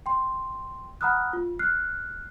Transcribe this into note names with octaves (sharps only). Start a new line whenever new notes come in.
G5 C6
F#5 A#5 B5 D#6 F6 F#6
F4
F6 F#6 C7